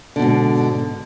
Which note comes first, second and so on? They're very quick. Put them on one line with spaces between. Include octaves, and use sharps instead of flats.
D3 B2 G#2